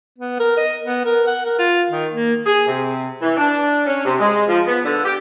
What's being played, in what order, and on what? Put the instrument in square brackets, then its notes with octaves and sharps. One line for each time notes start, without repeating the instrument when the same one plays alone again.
[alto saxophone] B3
A#4
D#5
B3
A#4
F#5
A#4
F4
D#3
A#3
[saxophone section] G#4
C3
E3
D4
C#4
C3
G#3
F3
B3
D3
G4